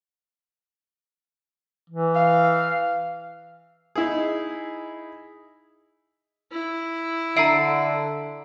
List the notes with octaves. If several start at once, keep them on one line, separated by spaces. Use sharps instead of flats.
E3
F5
D#4 E4 G#4
E4
D3 E5 A#5 E6 C7 D7